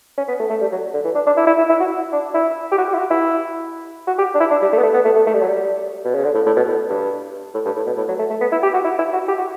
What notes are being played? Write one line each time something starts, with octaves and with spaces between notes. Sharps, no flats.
C#4
B3
A3
A3
G3
F#3
D3
E3
D4
D4
E4
E4
E4
E4
F#4
D4
E4
G4
F#4
G4
E4
F#4
E4
F#4
G4
D4
E4
D4
G3
A3
B3
A3
B3
A3
A3
A3
G3
F#3
G3
B2
C#3
D3
A2
A2
B2
A2
G2
A2
G2
A2
B2
A2
F#3
A3
A3
B3
E4
G4
F#4
E4
E4
F#4
G4
F#4